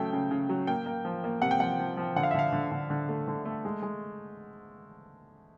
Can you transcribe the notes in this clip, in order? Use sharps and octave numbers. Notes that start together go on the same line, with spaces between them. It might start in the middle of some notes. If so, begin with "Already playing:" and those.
Already playing: C#3 F#3 A3 G5
C#3
C#3
F#3
A#3 G5
A#3
F3
A#3
C3 F#5
G5
F3 F#5
F3
F3
D3 F#5
F5
E5
D3 F5
D3
D3
D3
A3
D3
A3
G#3
G#3